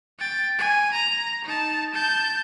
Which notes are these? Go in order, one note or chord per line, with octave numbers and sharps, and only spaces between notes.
G5 A6
G#5
A#5
D#4 A5
A5 G6